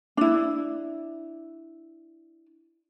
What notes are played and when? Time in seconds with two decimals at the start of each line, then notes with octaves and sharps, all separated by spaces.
0.17 D4 E4